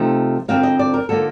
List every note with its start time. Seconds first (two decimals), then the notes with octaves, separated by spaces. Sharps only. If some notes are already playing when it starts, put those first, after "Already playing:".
Already playing: C3 F3 A3 D#4
0.48 F2 D3 A3 C4 D#4 F5
0.63 D#5
0.79 D5
0.94 A#4
1.09 D3 F3 A#3 D#4 A4